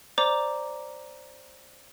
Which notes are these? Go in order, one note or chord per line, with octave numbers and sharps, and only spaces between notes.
C5 D5 A#5 D6